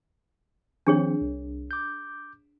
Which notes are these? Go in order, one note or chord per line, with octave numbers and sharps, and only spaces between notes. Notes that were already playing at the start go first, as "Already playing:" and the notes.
D#3 F3 C4 D4 G#4 C#5
C2
D6 G6